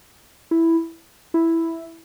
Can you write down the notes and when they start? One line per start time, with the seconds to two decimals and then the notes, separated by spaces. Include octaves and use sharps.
0.51 E4
1.34 E4